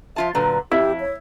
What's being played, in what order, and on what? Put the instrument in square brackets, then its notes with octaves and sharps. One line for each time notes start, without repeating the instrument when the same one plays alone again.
[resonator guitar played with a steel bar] F3 F4 A5 [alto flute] E5
[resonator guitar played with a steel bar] A#2 D3 F#3 [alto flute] B4
[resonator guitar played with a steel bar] F2 [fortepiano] E4 [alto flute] G4
[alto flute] C#5